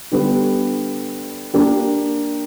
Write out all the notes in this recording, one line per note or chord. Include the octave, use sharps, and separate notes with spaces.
D3 G3 B3
A#3 D4 G4